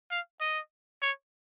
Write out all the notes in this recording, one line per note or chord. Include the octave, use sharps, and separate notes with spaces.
F5
D#5
C#5